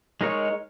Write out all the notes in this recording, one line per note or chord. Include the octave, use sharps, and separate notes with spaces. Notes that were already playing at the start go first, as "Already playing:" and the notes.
G#3 D#4 A#4 C#5